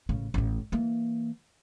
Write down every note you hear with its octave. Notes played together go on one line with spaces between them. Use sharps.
A1 C#3
A1 A2
E3 A#3